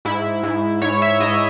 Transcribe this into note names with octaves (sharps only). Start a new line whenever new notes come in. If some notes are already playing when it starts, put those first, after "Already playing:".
G#2 E4
G#2
G#2 C#5
E5
G#2 D#5